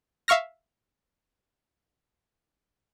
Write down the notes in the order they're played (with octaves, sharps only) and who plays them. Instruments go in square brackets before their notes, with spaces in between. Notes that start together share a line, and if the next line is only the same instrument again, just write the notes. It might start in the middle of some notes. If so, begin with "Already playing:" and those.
[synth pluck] E5 F5 C#6 F6 A#6